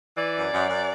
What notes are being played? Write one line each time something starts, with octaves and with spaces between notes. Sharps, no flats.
E3 D5
F#2
F#2
F#2